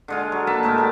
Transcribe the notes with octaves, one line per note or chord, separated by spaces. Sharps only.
D3 G#3 F4
F#3
A#3 B4 E5 A5
A2 G#3 A3 A#4
A#2 A5